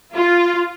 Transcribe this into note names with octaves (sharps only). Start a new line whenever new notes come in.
F4